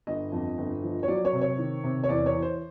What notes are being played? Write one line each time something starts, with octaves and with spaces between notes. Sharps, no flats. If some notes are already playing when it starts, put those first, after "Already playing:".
G1 D#5
F2
G1
F3
C#5
F#3 D5
C#5
C3
C#5
D#3
C3
C#5
E2 D5
C#5
E3
C5